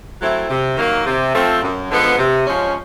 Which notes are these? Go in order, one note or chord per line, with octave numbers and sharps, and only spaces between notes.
F#3 A3 C4 E4
C3
D#3 F#3 A#3
C3
F3 A3 C4
F#2
D3 F3 G#3 B3
C3
F3 G#3 C#4